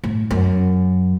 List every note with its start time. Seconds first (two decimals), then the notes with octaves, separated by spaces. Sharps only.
0.04 A2
0.31 F#2